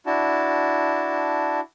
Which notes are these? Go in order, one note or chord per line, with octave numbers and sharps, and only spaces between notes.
D4 E4 F#4 A5